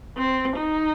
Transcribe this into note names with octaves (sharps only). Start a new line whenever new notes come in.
C4
D#4